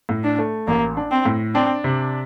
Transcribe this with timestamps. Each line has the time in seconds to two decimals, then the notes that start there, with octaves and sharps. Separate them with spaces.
0.09 A2
0.24 D4
0.38 A3
0.67 A1 A#3
0.97 D4
1.11 C4
1.25 A2
1.54 C4 D4
1.84 C3